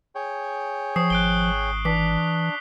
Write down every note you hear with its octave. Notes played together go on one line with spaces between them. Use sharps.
G#4 C#5 G5
F3 C#6 D#6 C7
G#1 F#6 D7 G7
E3 D4 D6 B6